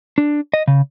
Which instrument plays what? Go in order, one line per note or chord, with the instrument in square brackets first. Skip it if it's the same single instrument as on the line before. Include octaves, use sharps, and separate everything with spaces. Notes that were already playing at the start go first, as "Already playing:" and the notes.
[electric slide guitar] D4
D#5
C#3